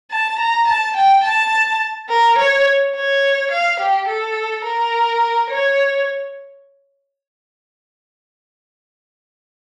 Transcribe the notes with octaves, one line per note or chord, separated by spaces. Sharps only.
A5
A#5
A5
G5
A5
A#4
C#5
C#5
F5
G4
A4
A#4
C#5